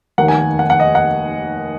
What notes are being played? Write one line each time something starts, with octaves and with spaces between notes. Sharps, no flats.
F1 D#2 D#3 A#3 F#5
G#5
G#5
F#5
F#5
D#5
F#5